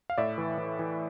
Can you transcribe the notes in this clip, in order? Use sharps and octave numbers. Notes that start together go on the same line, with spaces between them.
F5
A2 D5 E5
E3
E3
E3